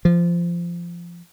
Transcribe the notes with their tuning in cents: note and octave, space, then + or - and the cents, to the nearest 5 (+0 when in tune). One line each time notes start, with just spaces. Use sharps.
F3 -20